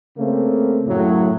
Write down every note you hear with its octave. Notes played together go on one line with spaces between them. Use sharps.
C#3 A3 A#3 C4
F#2 A2 C#3 F#3